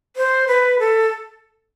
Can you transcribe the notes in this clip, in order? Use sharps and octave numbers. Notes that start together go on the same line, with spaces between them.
C5
B4
A4